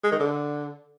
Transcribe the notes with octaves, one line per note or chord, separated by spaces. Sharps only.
G#3
D#3
D3